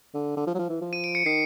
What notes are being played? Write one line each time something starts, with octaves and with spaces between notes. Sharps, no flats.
D3
D3
F3
F#3
F3
E3
F3
D#7
D7
C#7
D#3 C7